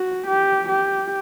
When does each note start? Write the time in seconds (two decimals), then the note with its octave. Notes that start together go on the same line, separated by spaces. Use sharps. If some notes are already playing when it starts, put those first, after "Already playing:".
Already playing: F#4
0.27 G4
0.69 G4